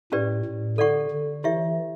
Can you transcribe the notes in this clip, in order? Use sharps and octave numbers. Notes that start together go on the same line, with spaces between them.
A2 C#4 G4 B4 D5
A2
D3 A4 D5 F#5 C#6
D3
E3 E4 G4 C#5 E5